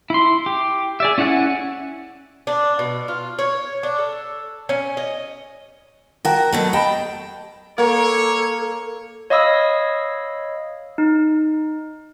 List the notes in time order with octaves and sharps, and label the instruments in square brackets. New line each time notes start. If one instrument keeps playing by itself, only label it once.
[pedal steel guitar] E4 C6
G4
G#4 D5 E5
C#4 E4 D5 F#5 G#5
[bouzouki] D4
B2
F4
C#5
D4
A4
C#4
D#5
[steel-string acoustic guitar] F#4 A#4 [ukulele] F#5 G5 A5
[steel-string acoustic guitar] B2 F#3 A3
[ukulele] D#5 A5 B5 [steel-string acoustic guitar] G5
[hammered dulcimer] A#3 [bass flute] A4 [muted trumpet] C#5
[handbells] C#5 D#5 F5 B5 D#6 E6
D#4